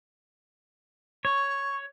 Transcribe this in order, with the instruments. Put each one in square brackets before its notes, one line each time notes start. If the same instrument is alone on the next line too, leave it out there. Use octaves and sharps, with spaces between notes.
[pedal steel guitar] C#5 [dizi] C#6